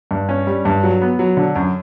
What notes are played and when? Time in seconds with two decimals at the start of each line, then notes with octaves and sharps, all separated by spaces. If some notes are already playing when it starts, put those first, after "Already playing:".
0.11 G2
0.29 C#4
0.47 G3
0.65 G2
0.83 F#3
1.02 B3
1.19 F#3
1.37 D3
1.56 F#2